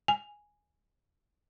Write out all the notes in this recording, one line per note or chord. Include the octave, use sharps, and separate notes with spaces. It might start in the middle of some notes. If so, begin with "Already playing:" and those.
G#5